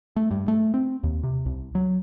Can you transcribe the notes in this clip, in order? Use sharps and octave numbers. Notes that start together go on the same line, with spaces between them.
A3
G2
A3
C4
D#2
C3
C2
F#3